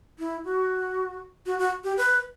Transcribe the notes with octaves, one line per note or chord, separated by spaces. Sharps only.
E4
F#4
F#4
F#4
G4
B4